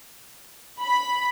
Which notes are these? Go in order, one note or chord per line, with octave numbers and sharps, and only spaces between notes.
B5